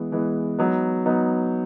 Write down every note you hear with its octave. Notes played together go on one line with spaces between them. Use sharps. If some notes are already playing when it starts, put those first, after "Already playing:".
Already playing: E3 G#3 B3
E3 G#3 B3
F#3 B3 D#4
F#3 B3 D#4